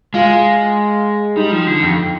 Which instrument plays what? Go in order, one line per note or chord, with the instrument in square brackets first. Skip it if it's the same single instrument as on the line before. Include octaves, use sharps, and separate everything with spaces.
[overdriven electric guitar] G#3 [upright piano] F4
[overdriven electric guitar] G3 [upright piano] D#4
[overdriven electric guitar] F3
D3
F2